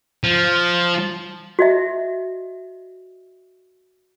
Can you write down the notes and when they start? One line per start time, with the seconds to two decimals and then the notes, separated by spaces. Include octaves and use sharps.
0.24 F3
1.59 F#4 D#5 E5